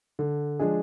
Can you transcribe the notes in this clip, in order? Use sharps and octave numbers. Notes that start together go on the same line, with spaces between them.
D3
F3 G#3 D4 G#4